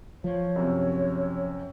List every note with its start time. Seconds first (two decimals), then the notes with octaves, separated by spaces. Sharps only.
0.24 F3 C#5
0.56 F#2 C3